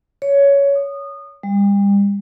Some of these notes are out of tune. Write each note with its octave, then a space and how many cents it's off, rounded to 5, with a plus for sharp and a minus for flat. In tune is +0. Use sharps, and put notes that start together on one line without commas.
C#5 +15
D#6 -25
G3 +35